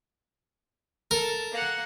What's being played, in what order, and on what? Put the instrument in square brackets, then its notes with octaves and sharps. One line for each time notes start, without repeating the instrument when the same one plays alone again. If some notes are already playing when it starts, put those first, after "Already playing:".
[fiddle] A4 [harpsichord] A#4
[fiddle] A#3 F#5